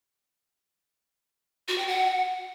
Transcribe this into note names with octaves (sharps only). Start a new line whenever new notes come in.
F#4
G5
F#5